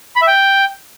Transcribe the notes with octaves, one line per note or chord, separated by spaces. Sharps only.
B5
E5
G5